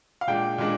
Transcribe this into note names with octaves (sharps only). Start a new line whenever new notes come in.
F5
A#2 G#3 D4 G5
A#2 G#3 D4